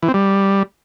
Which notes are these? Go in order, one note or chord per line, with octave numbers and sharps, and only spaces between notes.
E3
C4
G3